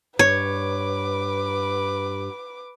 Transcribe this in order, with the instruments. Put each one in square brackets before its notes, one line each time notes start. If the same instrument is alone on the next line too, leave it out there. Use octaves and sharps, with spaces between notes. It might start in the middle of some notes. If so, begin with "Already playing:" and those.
[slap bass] G2 [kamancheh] B4 D6 [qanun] C#5